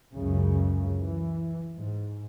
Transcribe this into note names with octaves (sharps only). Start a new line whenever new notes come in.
C#2 F#2 C#3
E3
G#2